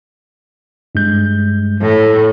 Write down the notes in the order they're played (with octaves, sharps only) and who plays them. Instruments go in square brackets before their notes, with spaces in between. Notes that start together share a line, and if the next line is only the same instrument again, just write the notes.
[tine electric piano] G2 G#3 G6
[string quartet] A2